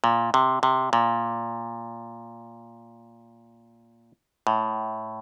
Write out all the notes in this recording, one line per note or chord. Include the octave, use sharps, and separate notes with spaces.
A#2
C3
C3
A#2
A2